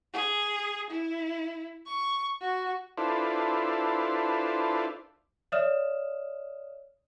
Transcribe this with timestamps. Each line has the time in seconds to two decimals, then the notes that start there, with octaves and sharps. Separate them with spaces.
0.14 G#4
0.90 E4
1.86 C#6
2.41 F#4
2.97 D4 E4 F4 A4 B4 C5
5.52 C#5 D5 E5 D#6 F6 E7